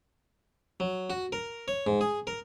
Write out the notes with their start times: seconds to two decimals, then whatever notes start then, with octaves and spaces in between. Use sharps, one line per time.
0.80 F#3
1.10 F#4
1.32 A#4
1.68 C#5
1.87 G#2
2.01 G#4
2.27 A#4